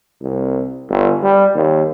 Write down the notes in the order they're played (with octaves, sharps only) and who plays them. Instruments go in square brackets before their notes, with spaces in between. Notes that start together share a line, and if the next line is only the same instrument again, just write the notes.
[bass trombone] C2
G1
G3
D#2